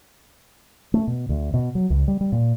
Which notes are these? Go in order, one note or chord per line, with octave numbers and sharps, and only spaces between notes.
A3
B2
D2
B2
F#3
C#2
G3
G3
A#2